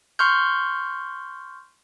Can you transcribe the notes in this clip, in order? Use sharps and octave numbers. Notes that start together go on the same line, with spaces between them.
C6 C#6 F6 G6